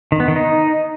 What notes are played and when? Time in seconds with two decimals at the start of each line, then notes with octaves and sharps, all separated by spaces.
0.12 D#3
0.20 B3
0.28 D#3
0.36 D#4